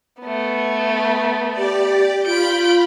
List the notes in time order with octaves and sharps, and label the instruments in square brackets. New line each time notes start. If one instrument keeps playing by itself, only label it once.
[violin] A3 B3
[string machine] G4 D5
[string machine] F4 B5 [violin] G6 D7